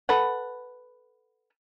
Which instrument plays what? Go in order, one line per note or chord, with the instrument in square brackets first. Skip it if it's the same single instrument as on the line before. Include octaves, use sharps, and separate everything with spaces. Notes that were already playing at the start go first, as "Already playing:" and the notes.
[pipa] A4 B4 F#5